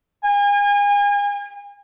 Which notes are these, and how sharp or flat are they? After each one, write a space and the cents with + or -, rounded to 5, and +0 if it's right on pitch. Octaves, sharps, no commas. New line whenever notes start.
G#5 -35